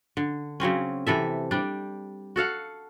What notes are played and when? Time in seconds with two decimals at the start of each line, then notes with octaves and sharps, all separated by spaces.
0.17 D3
0.60 C#3 F#3 C4 C#4
1.07 C3 E3 A4 E5
1.51 G3 D4
2.36 F#4 A4 F5 F#5